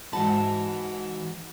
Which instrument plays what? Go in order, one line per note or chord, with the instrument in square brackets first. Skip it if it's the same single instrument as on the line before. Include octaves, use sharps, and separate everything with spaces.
[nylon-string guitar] G#2 F#4 A5 [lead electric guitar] E3 B5